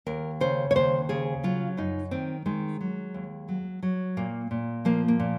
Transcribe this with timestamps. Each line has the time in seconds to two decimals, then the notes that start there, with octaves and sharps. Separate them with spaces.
0.06 D#2 A#4
0.40 C#3 C5
0.71 C#5
0.75 D#2 C5
1.09 C#3 G#4
1.44 F#3 F4
1.77 F#2 D#4
2.11 D#3 C4
2.46 D#3 G#3
2.81 F#3
3.14 D#2
3.48 F#3
3.82 F#3
4.17 A#2 A#3
4.51 A#2
4.85 F3 A#3
5.08 A#3
5.20 A#2